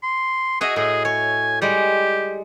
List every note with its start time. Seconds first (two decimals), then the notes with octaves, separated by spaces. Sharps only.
0.03 C6
0.61 F#4 G#4 D#5 E5
0.76 A2 G#4
1.05 C#5 G#5
1.62 G3 G#3 G4